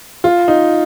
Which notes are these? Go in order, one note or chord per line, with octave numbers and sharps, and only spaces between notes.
F4
D#4